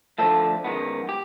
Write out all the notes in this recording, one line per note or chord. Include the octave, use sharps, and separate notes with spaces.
D2 D3 F3 A3 A4
F#2 D#3 G#3 B3
G4